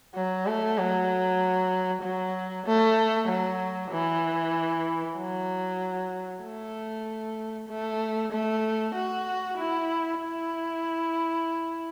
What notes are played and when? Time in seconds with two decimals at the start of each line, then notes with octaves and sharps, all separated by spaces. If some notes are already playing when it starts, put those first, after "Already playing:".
0.15 F#3
0.46 A3
0.78 F#3
2.02 F#3
2.66 A3
3.29 F#3
3.92 E3
5.18 F#3
6.44 A3
7.69 A3
8.32 A3
8.95 F#4
9.58 E4
10.20 E4